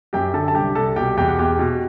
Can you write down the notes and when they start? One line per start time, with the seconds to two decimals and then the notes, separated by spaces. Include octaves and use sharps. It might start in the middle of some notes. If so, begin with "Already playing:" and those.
0.13 F#2 G4 G5
0.34 D3 A4 A5
0.48 A5
0.55 C2 G4 G5
0.75 C2 A4 A5
0.96 B2 G4 G5
1.17 E2 G4 G5
1.28 F#5
1.39 E2 G4 G5
1.59 B2